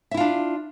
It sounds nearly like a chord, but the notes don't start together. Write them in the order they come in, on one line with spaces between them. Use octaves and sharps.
E5 E4 F4 D4